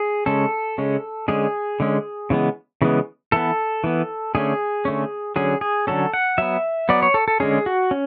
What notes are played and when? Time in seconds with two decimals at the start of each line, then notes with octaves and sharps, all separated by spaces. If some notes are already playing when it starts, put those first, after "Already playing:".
Already playing: G#4
0.26 C#3 G#3 C#4 A4
0.78 C#3 G#3 C#4
1.28 D3 G#3 C#4 G#4
1.80 D3 G#3 C#4
2.30 C#3 E3 G#3 B3
2.82 C#3 E3 G#3 B3
3.32 E3 B3 A4
3.84 E3 B3
4.35 D3 A3 C#4 G#4
4.85 D3 A3 C#4
5.36 D3 F#3 C#4 G#4
5.61 G#4
5.87 D3 F#3 C#4 A4
6.14 F#5
6.38 F#3 B3 E5
6.89 F#3 B3 D5
7.03 C#5
7.14 A4
7.28 A4
7.40 D3 G#3 C#4 G#4
7.66 F#4
7.91 C#4